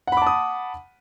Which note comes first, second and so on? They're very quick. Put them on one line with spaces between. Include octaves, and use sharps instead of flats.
F#5 B5 D6 A5 D#6